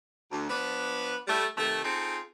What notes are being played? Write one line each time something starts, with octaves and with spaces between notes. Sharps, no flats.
D2
F3 B3 D4 B4
G3 A3
C3 D#3 A3
C4 D#4 F4 G#4 A4